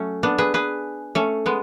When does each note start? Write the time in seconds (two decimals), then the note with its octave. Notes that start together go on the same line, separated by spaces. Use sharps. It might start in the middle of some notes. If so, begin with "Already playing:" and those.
Already playing: F#3 A3 C#4
0.23 B3 D4
0.38 G#4 B4
0.54 G#4 B4
1.15 A3 C#4
1.46 G#3 B3